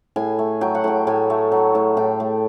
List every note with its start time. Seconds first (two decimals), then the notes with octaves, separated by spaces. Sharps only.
0.16 A2 G#5
0.39 A3
0.61 F#3 G5
0.75 F#5
0.84 A2 G5
1.07 A2 G#5
1.30 A3
1.52 F#3
1.75 A2
1.97 A2 G5
2.20 A3